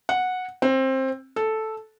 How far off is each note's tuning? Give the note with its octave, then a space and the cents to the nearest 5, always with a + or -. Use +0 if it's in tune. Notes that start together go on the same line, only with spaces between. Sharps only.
F#5 -10
C4 +20
A4 -5